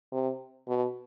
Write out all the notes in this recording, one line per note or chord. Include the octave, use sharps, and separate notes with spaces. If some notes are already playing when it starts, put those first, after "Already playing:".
C3
B2